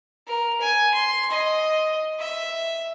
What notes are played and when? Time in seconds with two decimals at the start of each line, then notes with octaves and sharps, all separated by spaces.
0.28 A#4
0.61 G#5
0.94 C6
1.31 D#5
2.19 E5